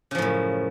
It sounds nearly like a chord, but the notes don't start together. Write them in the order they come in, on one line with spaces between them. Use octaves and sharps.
C#3 F3 A2 F#2